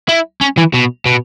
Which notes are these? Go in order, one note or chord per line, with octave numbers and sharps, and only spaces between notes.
E4
C#4
E3
B2
B2